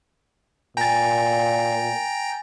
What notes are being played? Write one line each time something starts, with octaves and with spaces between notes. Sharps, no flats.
A#2 G5 G#5 A#5 A6